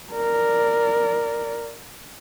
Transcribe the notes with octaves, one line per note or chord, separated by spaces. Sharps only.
A#4 D5